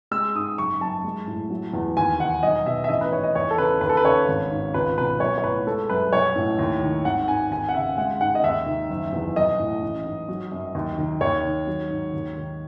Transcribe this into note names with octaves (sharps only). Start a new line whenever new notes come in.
G#3 E6
G#2 D#6
F#1 C#6
F#2 A5
G#3
A2
F#3
E2
D#2 G#5
D#3 F#5
B1 D#5
B2 E5
E5
A1 D#5
B4
G#2 C#5
D#5
E2 C#5
A4
C#3 B4
D#2 B4
A4
B4
C#3 C#5
G#1
G#2
C#2 B4
B2 B4
B1 C#5
C#5
A2 B4
G#3 A4
F#2 B4
B1 C#5
A2
D#2
D#3
G#1 F#5
G#2 G#5
D#2 G#5
F#5
C#3 E5
G#3 F#5
G#2 F#5
D#5
D#2 E5
D#3
F#1
E2
B1 D#5
A2
A1
G#2
F#3
F#2
D#2
D#3
D#2 C#5
D#3
F#3
G#2
D#2
D#3